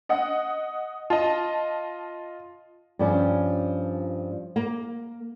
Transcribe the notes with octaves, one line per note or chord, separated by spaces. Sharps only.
D#5 F#5 D#6
F4 D#5 A5
G2 F3 C#4
A#3